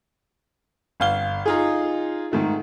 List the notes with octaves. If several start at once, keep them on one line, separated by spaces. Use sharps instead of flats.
G1 F5 G7
D#4 F4 G#4
G#2 D#3 A3